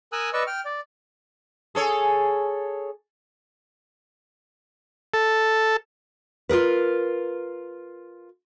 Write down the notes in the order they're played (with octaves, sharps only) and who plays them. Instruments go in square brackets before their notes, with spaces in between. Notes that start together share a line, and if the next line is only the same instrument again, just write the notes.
[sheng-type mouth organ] A#4 G#5 D#6 E6 F#6
B4 D5 D#5 C#6 E6
G5 F6
D5
[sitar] G#4 A4 C#5
[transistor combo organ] A4
[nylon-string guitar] F4 G#4 A#4 B4